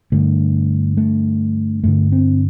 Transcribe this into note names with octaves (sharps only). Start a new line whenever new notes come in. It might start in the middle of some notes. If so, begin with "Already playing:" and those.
G2 D3 A3
A3
G2 D3 A3
C4